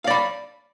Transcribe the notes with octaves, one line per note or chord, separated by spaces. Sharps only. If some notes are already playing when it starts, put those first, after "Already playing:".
D5 F5 B5